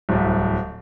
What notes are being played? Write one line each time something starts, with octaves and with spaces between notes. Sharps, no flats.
D1 C2